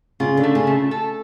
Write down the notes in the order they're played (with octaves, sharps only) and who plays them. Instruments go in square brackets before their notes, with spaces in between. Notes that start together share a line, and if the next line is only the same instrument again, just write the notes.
[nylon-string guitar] C#3 [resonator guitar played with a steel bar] F4
[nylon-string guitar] D3
[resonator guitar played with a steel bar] A3
[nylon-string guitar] C#3
[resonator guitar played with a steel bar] A3
A4